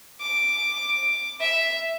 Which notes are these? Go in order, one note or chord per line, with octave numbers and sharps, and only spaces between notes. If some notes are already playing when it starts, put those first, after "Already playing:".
D6
E5